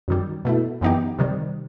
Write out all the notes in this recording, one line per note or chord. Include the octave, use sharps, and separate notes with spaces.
F#2 D#3 G3
B2 A3 E4
F#2 E3 B3 D#4 G4
C3 D#3 G3